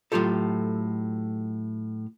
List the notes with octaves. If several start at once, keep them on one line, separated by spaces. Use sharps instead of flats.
A2 F#3 F4 G4 A4